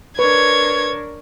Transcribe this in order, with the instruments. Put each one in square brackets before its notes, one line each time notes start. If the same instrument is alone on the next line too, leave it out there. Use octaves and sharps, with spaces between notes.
[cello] D4 A#4 [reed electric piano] B4 [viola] C#5 [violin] G#6